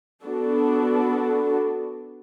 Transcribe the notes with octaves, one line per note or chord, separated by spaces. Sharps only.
B3 D4 F#4 A4